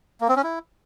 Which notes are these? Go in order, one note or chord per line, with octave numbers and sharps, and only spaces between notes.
A#3
C4
C#4
E4